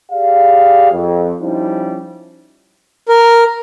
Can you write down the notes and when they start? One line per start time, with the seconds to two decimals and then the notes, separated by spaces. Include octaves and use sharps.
0.12 G4 G#4 D5 F5
0.92 F2
1.41 F3 G3 C#4 D#4 E4
3.09 A#4